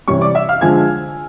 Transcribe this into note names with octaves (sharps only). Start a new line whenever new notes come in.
C3 E3 G3 C#5 C#6
D5 D6
E5 E6
F5 F6
D3 F3 G#3 G#5 G#6